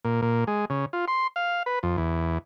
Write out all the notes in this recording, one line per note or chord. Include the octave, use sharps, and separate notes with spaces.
A#2
A#2
G#3
C#3
F4
C6
F5
B4
F2
E2